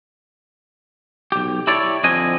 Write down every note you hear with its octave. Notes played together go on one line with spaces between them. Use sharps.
B1 G4
E4 G4 A4 C#5 D5
F2 D3 C4 D#5 G#5